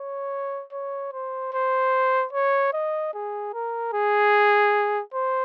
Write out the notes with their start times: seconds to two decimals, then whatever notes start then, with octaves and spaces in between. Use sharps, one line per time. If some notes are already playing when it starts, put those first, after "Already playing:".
Already playing: C#5
0.72 C#5
1.13 C5
1.53 C5
2.33 C#5
2.73 D#5
3.14 G#4
3.54 A#4
3.93 G#4
5.14 C5